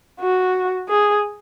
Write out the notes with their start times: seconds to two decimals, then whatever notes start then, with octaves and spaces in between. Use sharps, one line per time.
0.20 F#4
0.89 G#4